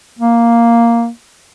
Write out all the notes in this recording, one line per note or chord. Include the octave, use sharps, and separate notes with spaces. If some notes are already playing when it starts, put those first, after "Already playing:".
A#3